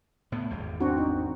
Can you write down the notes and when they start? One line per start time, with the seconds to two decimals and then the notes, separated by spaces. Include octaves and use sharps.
0.32 A2 B3
0.50 G#1 E2 G3
0.80 C4 D4 F#4
0.98 D#4